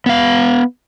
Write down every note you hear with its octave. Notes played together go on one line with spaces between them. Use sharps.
B3 F5